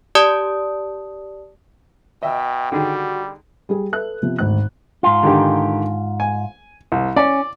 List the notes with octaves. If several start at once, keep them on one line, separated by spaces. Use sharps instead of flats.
G4 D5 A5 D#6
B2 D#5 E5 G5 E6
D3 D#3 G3 F#4 G#4
G3 G#4
A4 B4 E5 F#6
C3 F3 B3
G#1 D2 F#6
G#2 F4
D3 D#3 G4
G#5
C2
C#4 D5